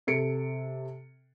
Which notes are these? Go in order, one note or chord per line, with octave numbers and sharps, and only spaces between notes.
C3 A4 C#7 D7